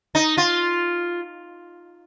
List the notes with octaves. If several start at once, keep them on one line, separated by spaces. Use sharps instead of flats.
D#4
F4